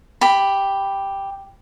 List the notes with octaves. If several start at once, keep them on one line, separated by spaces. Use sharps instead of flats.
G4 B5